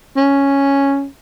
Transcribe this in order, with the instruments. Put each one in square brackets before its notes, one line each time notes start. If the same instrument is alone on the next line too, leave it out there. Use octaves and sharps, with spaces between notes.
[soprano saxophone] C#4